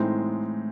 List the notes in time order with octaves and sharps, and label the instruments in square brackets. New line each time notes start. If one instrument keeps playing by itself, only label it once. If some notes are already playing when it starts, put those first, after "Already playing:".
Already playing: [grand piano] A2 E3 G#3 C4 D#4